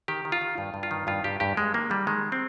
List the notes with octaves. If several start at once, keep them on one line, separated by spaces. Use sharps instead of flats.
D#3 G4
D#3
F4
D#3
G2
G2
F4
D#3
G2 F4
G2 G4
G2 G4
G2 G#3
D#3 A#3
D#3 G3
D#3 G#3
C4